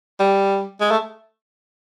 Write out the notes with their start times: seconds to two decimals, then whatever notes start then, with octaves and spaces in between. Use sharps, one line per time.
0.20 G3
0.81 G#3
0.91 A3